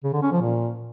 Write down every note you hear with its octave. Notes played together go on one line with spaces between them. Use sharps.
C#3
D3
C#4
F3
A#2